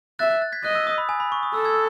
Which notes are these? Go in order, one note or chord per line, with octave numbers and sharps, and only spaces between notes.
E5 F#6 A6
F#6
F#6 A6
G#6 B6
D#5 F#6
E6
D#6
B5
G#5
B5
C#6
D#6
A4 E6
E6 G#6